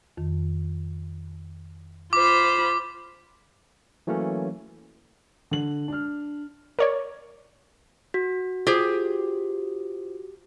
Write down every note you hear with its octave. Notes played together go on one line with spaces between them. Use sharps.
F2 D#3
F4 C5 B5 D6
E3 F#3 A3 A#3 C#4
D3 F#7
D4 F6
A#4 C#5 D5
F#4
F4 G4 G#4 C5